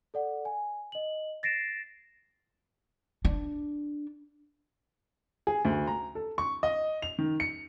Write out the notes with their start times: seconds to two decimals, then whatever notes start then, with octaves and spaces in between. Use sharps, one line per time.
0.14 A4 D5 F#5
0.45 G#5
0.92 D#5 F#7
1.43 A6 A#6 C7 D7 E7
3.25 D4
5.47 G#4
5.65 D2
5.87 A#5
6.15 A4
6.38 C#6
6.63 D#5
7.02 F7
7.19 D#3
7.40 C#7